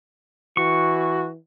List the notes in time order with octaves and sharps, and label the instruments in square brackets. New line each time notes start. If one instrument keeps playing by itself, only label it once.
[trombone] E3 [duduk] F#4 [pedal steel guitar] C#6